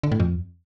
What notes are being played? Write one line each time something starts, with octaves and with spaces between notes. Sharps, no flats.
D3
A2
F2